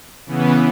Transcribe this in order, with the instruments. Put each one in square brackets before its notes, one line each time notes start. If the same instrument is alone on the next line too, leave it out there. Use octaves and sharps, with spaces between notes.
[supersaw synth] C#3 E3 B3